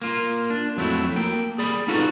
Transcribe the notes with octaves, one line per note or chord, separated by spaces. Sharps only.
A#3 F4
D4
F2 F#3 A3 E4
A#3 G5
G#4 D5 B5
D#4 F4 F#4 A4 B4